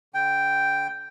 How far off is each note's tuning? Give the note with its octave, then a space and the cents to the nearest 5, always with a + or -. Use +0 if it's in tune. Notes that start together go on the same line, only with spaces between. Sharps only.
D3 -25 G5 +0